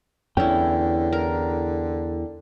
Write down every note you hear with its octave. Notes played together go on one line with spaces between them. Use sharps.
E2 D3 C#4 E4 G5
A#4